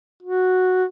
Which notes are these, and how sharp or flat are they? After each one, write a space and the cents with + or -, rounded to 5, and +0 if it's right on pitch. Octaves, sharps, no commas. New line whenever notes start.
F#4 -5